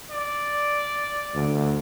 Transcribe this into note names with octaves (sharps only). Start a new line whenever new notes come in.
D5
D2